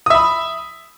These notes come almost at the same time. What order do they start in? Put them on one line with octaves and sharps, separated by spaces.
D#6 E5 B5